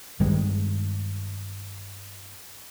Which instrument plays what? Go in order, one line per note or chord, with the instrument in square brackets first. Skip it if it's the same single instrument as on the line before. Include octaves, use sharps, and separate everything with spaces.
[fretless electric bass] G2 D#3 G3 G#3